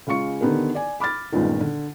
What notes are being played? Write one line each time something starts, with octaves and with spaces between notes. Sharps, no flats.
C#3 G#3 F4 C#6 C#7
D3 D#3 B3 G4 A#4
D5 G#5
B5 D6 F6 A6
G1 C#2 A#2 D#3
D3